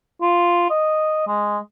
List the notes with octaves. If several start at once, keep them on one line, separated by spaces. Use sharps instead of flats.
F4
D#5
G#3